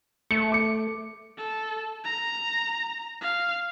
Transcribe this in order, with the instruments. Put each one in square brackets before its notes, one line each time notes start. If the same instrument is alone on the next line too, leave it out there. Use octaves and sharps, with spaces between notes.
[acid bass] A3 [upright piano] C#7
[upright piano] D6 C#7
[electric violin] A4
A#5
F5